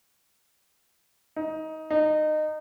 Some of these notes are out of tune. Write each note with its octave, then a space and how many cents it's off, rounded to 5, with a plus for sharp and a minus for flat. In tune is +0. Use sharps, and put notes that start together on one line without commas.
D#4 +20
D#4 -20